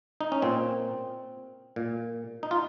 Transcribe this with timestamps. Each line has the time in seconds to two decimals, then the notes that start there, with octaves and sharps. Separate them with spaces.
0.21 D#4
0.32 C#4
0.42 A#2 C4
1.76 A#2
2.43 D#4
2.51 F4